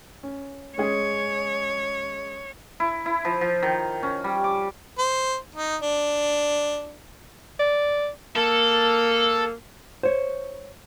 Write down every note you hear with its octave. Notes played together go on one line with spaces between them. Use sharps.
C#4
G#3 C#4 G#4 C#5
E4
E4
F3
F3
D#3
C#4
G3
D6
C5
D#4
D4
D5
A#3 A4
C5 C#5